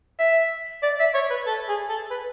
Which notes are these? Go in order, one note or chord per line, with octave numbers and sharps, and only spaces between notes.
E5
D5
E5
C#5
B4
A4
G#4
A4
B4